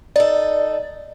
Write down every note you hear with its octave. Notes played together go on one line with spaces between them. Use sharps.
D#4 A4 D5